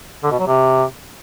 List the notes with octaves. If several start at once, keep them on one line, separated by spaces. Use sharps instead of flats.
D3
B2
F#3
C3